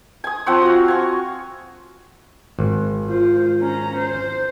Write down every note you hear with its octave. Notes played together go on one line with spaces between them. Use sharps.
G#5 D#6
F3 C4 F#5 C#6
F#4 F5
G#5 C#6
G#1
F4 C5
C#4 A#5
C5